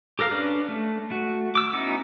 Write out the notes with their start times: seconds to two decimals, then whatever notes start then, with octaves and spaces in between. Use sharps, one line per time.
0.19 G4 A4 A#4 F5 F6
0.31 C#4 D4 B4 D5
0.68 A3
1.10 A3 F#4
1.55 D6 E6
1.73 B3 C#4 D#4 E4 F#4